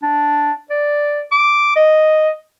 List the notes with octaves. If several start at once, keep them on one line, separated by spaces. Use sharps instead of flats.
D4
D5
D6
D#5